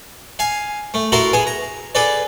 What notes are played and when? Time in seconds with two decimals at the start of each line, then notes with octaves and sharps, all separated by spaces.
0.39 F5 G#5
0.94 A3
1.12 E4 F#4 A4 A#4 A#5 C6
1.33 B3 G#4 G#5
1.47 A#5
1.95 G#4 A4 B4 D5